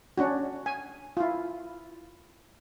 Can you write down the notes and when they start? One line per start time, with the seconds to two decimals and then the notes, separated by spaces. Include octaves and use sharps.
0.18 C#4 D4 F#4
0.66 G#5
1.17 E4 F4